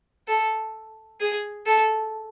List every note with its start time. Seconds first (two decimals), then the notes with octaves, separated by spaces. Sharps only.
0.28 A4
1.20 G#4
1.66 A4